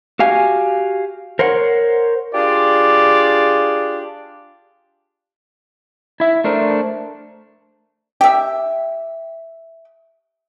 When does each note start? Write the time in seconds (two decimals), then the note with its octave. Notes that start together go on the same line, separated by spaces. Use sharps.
0.19 F#4 G4 F5 G#5
1.39 A#4 C5 C#5 F#5
2.34 D4 F4 G4 G#4 D5
6.20 E4 E5
6.44 A3 D4 A#4 C5
8.21 G4 E5